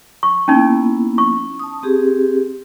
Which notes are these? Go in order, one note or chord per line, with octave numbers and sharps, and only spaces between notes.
C#6
A#3 B3 C#4 D#4 E4
C#6
A5 D#6
C4 G4 G#4